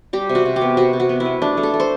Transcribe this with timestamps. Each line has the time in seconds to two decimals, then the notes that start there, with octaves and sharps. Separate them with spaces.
0.13 G3 G4
0.29 C3
0.35 F#4
0.46 C3
0.56 G4
0.61 B3
0.77 C3 F#4
0.93 C3
1.00 F#4
1.09 B3
1.20 E4
1.25 B3
1.42 A3 D4
1.57 A3
1.63 A4
1.74 A3
1.80 C5